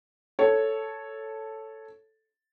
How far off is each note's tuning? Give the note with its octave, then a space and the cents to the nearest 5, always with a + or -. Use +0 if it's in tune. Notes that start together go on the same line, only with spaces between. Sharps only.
A4 +0 C#5 +0